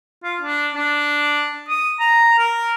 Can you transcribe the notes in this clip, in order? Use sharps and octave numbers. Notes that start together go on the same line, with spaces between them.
F4
D4
D4
D#6
A#5
A#4